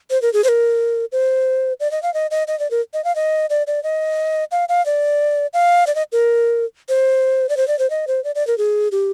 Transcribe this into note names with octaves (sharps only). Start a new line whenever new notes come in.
C5
A#4
G#4
C5
A#4
C5
D5
D#5
F5
D#5
D#5
D#5
D5
A#4
D#5
F5
D#5
D5
D5
D#5
F5
F5
D5
F5
D5
D#5
A#4
C5
D5
C5
D5
C5
D#5
C5
D5
D5
A#4
G#4
G4